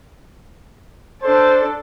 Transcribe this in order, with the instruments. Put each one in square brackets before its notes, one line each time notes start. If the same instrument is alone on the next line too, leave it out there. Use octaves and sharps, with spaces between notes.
[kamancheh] D4 A4 [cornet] C5